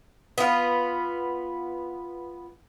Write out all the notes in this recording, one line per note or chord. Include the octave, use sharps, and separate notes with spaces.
B3 F4